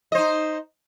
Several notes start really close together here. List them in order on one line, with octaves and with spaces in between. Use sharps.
D#5 C5 D#4